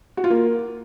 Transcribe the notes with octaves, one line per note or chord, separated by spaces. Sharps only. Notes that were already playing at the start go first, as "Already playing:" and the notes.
F#4
F4
A#3